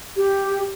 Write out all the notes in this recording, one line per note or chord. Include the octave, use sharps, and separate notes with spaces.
G4